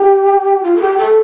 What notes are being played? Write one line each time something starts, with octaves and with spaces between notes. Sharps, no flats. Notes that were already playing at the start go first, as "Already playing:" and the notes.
Already playing: G4
F4
A4
G4
A4